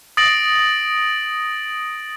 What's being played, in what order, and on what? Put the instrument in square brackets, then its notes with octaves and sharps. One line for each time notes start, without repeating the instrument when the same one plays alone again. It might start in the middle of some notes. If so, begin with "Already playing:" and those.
[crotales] D#6 A6 A#6 D7 F#7